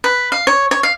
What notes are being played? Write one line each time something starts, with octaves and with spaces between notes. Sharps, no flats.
B4
F5
C#5
C#5
F5